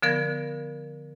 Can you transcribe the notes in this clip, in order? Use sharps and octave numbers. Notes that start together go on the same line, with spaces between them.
D3 F3 B3 A#4 G#6